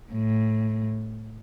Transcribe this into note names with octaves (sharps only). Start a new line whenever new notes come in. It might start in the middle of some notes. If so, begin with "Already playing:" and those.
A2